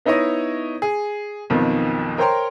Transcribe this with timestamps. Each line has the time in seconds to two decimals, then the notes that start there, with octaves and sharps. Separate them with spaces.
0.05 B3 D#4 E4 C#5 D#5
0.82 G#4
1.50 B1 F2 B2 D#3 F3
2.18 A#4 C5 C#5 G5 A#5 C6